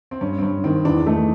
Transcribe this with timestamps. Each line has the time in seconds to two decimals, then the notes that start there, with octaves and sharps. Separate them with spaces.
0.11 C4
0.21 G2 C#4
0.38 C4
0.42 G2 C#4
0.64 D#3 C4
0.85 E2 D4
1.06 A3 D#4